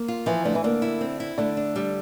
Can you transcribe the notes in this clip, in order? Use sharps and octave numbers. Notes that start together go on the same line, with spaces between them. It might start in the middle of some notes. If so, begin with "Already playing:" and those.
Already playing: A#3
F4
E3 F3
D3 A3
E3
D3 A#3
E4
C4
E4
D3 A3
D4
G3